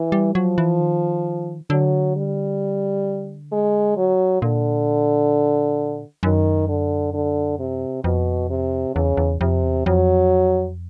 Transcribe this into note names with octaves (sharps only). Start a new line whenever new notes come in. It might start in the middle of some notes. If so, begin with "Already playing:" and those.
Already playing: E3
G3
F3 F#3
E3
D#3
D3 F#3
G3
G#3
F#3
A#2 D3
F#2 D#3
D3
D3
C3
F2 B2
C3
E2 C#3
E2
F2 C3
E2
F2 F#3